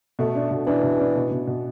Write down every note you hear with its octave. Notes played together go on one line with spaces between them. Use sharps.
B2 A3
D4
B2
E3 D4
B2
D4
B2
B2
B2